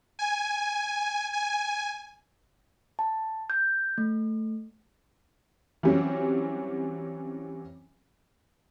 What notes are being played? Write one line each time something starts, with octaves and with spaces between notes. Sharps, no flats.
G#5
G#5
A5
G6
A3
E3 F#3 G3 C4 C#4